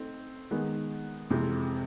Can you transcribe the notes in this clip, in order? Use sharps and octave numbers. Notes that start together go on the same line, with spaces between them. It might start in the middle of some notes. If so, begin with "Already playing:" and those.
Already playing: A3 C4 D#4
D#3 G#3 B3 D#4
F2 C3 E3 G#3 C4